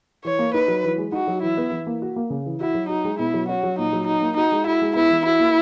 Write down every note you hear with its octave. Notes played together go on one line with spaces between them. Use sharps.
E3 C#5
A#3
D#4 B4
F#3
E3
G#3
D#4 F#4
F#3
E3 E4
B3
E3
A#3
F#4
A#3
C#3
E3
E4 F#4
F#3
D#4 F#4
G#3
B2 E4
F#3
C#4 F#4
F#3
A#2 D#4
F#3
D#4 F#4
A#3
D#4 F#4
G#3
E4 F#4
G#3
B3 E4
E3
E4 F#4
A#3